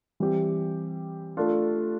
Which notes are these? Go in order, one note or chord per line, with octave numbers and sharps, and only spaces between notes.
E3 G3 C4 G4
A3 D4 F4